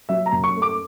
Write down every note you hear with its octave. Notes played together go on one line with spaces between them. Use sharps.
F#3 E5
A#5
F#2
C#6
A3
D6